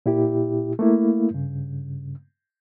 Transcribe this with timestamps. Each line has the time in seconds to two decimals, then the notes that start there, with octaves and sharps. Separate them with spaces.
0.06 A#2 E4 G4
0.79 A3 A#3 E4
1.31 G2 C#3